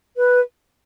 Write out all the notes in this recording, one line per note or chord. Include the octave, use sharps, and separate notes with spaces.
B4